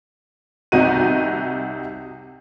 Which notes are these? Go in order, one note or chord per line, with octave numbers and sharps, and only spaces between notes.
C2 C3 D#4 F#4 D#7